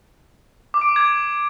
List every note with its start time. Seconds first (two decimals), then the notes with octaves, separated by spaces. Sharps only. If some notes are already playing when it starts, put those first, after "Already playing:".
0.74 D6
0.81 D7
0.89 D6
0.96 G#6